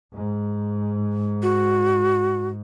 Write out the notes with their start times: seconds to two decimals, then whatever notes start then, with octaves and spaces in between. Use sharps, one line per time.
0.13 G#2
1.42 F#4